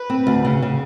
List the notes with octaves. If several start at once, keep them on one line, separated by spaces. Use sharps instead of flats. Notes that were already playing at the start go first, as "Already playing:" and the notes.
Already playing: B4
C4
D2
C#3
C#3